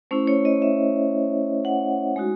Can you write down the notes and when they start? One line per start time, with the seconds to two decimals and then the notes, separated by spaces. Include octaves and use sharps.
0.11 A3 C#4 E4 C5
0.27 C#5
0.45 D#5
0.62 E5
1.65 F#5
2.16 G#3 D#4 F#4